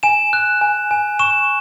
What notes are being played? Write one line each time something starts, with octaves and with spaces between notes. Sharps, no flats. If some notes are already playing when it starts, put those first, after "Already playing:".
G#5 E7
F#6
G#5
G#5
C#6 E7